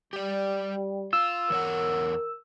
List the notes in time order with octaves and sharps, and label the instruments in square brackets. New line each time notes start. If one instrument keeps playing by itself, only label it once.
[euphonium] G3 [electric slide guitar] G4 D5
[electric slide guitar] F4 [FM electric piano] E6
[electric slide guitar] E2 C#5 F#5 [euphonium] A#4